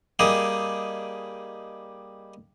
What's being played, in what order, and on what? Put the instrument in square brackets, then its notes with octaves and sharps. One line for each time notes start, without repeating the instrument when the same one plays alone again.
[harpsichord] G3 A#3 D#4 G4 G#4